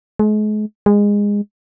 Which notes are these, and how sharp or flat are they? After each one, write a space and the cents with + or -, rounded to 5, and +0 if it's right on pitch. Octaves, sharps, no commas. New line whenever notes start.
G#3 +40
G#3 -20